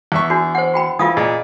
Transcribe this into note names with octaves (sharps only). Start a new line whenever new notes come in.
E2 E5 C#6
D4 F#4
C5 F#5
F#4 G5 B5
E3 F4 F5 D#6
A#2 G#4 D#5